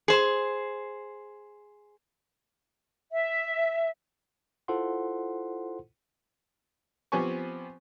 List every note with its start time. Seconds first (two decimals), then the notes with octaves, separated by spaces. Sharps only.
0.08 G#4 C5
3.13 E5
4.68 E4 F4 A4 C5 F#5 C6
7.12 F3 B3 C4 G4 G#5 C#6